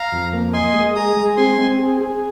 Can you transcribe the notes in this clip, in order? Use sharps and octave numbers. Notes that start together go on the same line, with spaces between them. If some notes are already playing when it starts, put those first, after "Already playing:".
Already playing: F5 A#5
F2
A#3
D#5 G#5 C6
G#3
G#4 A#5 D#6
G#3
C4 G#5 C6
C4
G#4
G#4